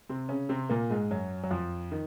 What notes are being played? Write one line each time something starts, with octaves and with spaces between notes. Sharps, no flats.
C3 C4
C#3 C#4
C3 C4
A#2 A#3
G#2 G#3
F#2 F#3
F#3
F2 F3
D#3